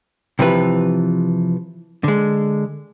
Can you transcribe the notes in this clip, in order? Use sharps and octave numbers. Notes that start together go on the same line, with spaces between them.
C3 E3 F3 B4
D3 G#3